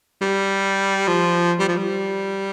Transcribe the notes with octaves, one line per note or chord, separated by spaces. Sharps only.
G3
F3
G3
F3
G3